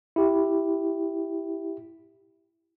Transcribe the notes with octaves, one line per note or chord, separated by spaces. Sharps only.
E4 G4